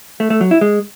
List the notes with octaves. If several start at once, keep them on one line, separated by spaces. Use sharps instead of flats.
A3
A3
F#3
E4
G#3